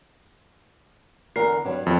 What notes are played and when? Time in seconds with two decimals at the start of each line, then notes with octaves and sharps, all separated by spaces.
1.36 E2 D3 A#4 C7
1.65 G2 F#3 D4
1.86 F2 D5 E5